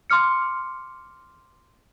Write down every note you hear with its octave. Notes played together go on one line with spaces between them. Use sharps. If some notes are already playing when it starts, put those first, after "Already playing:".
C6 D6 F6 C#7